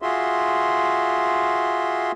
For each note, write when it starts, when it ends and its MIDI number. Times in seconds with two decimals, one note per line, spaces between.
0.02 2.12 65
0.02 2.12 66
0.02 2.12 68
0.02 2.12 76
0.02 2.12 84